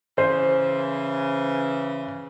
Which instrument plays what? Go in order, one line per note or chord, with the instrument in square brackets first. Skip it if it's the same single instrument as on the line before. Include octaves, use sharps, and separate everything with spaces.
[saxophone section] C#3 E3 [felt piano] C5